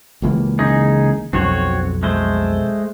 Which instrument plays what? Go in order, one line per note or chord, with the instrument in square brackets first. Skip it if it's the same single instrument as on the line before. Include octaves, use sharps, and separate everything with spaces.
[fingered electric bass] C#2 E3 A#3
[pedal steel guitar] C#3 D#4 G#4
[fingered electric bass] B1 F2 [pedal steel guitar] C4 F#4 C#5
[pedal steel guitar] G#3 A3 C5